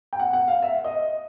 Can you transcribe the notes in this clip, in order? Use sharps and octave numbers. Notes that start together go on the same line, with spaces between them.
G5
F#5
F#5
F5
E5
D#5